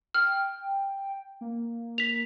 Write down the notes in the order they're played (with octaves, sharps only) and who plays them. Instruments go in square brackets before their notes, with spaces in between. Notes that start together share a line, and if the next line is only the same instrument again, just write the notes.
[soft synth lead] G5 [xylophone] F6
[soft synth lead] A#3
[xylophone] B6 F7